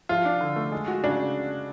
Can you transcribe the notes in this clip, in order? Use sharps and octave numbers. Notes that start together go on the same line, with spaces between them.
F3 F4
D4
D3
A3
G#3
F#4
C#3 D4